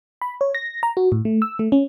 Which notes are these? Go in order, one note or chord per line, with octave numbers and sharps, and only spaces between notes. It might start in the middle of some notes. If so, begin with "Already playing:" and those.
B5
C#5
A#6
A#5
F#4
A2
A3
E6
A3
C#4